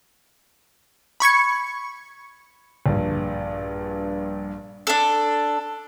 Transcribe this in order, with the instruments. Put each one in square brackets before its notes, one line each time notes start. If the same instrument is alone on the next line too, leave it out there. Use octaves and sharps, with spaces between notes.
[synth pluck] B5 C#6 G#6 C#7
[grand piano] A#1 G2
[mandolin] D4 A4